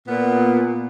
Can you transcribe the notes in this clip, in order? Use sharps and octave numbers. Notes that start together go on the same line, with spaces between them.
A#2 B3